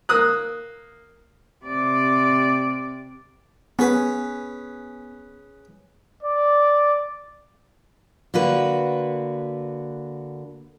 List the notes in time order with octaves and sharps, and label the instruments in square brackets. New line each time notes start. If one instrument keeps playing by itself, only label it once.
[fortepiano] A#3 D#6 F#6
[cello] C3 D5
[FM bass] B3 [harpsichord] C#4 G#4 B4
[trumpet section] D5
[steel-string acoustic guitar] D3 A#3 F#4 B4